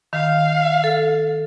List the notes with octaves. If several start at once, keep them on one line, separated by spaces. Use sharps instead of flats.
D#3 F5
A4